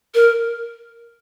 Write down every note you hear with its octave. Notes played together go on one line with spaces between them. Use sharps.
A#4